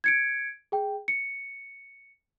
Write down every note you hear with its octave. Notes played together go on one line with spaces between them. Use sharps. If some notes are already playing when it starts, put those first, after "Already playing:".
G#6 C#7 D7
G#4 G5
C#7